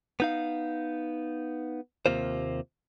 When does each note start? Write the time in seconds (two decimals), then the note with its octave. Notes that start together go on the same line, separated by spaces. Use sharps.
0.20 B3 D#4 F5
2.06 D#2 C3 A#3 F4 C5